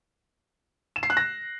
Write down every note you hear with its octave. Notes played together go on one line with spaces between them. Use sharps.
E7
C7
F#6
A#6